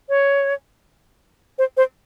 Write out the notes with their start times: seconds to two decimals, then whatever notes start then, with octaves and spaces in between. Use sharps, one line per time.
0.09 C#5
1.58 C5
1.77 C5